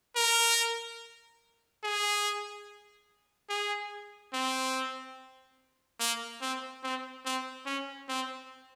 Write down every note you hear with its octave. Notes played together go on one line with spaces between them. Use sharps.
A#4
G#4
G#4
C4
A#3
C4
C4
C4
C#4
C4